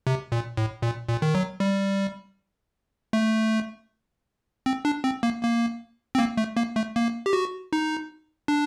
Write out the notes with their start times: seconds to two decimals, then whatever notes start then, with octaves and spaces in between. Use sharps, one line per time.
0.07 C3
0.32 A#2
0.57 A2
0.82 A#2
1.09 A#2
1.22 D#3
1.35 F#3
1.60 G3
3.13 A3
4.66 C4
4.85 D4
5.04 C4
5.23 A#3
5.43 A#3
6.15 C4
6.19 A#3
6.37 A3
6.57 A#3
6.76 A3
6.96 A#3
7.26 G4
7.33 F#4
7.73 D#4
8.48 D4